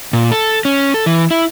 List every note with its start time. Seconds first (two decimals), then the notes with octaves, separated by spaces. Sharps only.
0.13 A#2
0.32 A4
0.65 C#4
0.94 A4
1.06 E3
1.31 E4